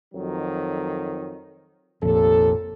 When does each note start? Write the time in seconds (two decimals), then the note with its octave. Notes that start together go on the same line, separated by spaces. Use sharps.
0.14 F2 D#3 F#3
2.02 F1 A#1 D#2 A#2 A4